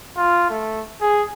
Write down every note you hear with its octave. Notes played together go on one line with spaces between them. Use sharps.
F4
A3
G#4